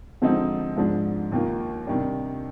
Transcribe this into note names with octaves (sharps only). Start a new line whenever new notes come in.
D3 F3 G#3 C4 D#4
G#2 F3 G#3 D4
D#2 D#3 A#3 F4
C3 D#3 G3 D4